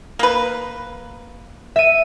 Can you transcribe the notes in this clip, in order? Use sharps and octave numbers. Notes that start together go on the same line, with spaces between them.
A#3 B4
E5 D#7